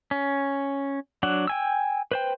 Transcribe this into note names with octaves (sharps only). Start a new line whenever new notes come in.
C#4
F#3 D4 F#5
G5 G#5 E6
B4 C5 G5